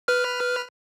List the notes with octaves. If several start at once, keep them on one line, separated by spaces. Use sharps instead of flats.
B4 F6